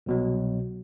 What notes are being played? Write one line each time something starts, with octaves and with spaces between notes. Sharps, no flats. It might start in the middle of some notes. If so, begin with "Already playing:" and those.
C2 B2 F#3